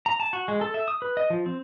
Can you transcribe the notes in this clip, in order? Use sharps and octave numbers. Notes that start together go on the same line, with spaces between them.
A#5
A5
F#4
G#3
A4
E5
D#6
B4
D#5
F3
C4